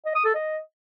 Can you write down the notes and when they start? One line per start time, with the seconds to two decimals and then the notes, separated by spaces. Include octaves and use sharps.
0.06 D#5
0.15 D#6
0.25 A4
0.35 D#5